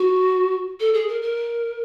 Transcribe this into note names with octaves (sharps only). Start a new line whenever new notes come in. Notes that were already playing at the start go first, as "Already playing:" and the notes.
Already playing: F#4
A4
G#4
A#4
A#4